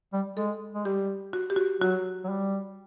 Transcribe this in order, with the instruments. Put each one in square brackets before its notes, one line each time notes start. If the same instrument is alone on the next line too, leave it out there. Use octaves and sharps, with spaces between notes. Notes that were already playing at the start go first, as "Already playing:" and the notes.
[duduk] G3
[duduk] G#3 [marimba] A4
[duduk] G#3
[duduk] G3 [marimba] G4
[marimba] F#4
G4
F#4
[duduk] F#3 [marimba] F#4
[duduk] F#3
G3